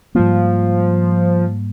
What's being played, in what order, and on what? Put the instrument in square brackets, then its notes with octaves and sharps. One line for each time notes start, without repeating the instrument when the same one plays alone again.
[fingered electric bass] G#2 G3 A#3 [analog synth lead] F3